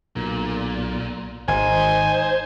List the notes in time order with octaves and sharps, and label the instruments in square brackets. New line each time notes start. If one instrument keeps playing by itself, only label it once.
[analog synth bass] B1 [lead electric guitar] A#2
[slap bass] G#1 [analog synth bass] D#4 [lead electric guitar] C5 [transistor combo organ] G#5